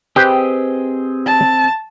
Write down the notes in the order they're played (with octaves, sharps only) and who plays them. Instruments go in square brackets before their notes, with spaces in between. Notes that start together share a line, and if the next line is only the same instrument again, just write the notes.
[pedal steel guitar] C4 G#4 D#5 [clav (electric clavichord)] G4 B4 C5
[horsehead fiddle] A5